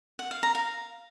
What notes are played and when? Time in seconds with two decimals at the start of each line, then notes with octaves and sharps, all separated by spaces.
0.19 F#5
0.31 F5
0.43 A#5
0.55 F5